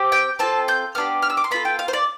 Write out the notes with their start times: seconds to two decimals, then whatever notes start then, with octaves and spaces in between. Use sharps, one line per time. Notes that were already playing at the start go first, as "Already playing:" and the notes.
Already playing: C4 G4
0.12 G5
0.39 C4 F4 A4 A5
0.68 G6
0.95 B3 D4 G4 F6
1.22 F6
1.30 E6
1.37 D6
1.44 C6
1.51 B3 F4 A4 B5
1.65 G5
1.79 F5
1.88 C5
1.93 D5